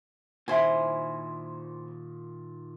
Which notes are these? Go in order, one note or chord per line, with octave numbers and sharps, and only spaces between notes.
A#2 D#3 E4 C5 G#5